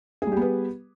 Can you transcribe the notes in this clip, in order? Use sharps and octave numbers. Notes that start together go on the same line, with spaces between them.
G3 B3 G4 G#4 B4